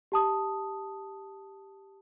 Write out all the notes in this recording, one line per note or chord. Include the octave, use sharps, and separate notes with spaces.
G4 A5 D#6